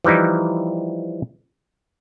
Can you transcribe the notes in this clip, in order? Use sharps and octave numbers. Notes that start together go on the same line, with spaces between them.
E3 F3 G3 D#4 E4